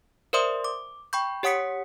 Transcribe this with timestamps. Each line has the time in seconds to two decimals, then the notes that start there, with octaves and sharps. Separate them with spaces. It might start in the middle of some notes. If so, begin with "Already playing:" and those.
0.33 A#4 C5 D5 E5 C6 D#6
0.64 D6
1.13 G5 B5 C#6 G6
1.43 G4 C#5 F#5 D#6 B6 C#7